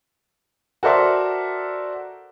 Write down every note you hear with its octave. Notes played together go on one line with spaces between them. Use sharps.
F#4 A4 A#4 C5 D5 E5